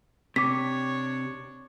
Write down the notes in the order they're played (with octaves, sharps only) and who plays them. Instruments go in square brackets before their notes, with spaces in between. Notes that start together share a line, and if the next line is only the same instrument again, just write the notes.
[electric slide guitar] C3 [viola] D4 C#5 [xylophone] D6 B6